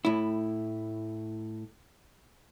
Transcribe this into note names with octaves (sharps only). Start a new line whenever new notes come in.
A2 E4